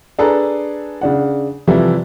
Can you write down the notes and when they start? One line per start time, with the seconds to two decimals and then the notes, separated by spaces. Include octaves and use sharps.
0.19 D4 G#4 A4 B4 A#5
1.01 C#3 D4 F#5
1.67 C3 E3 F3 G3 E4 A4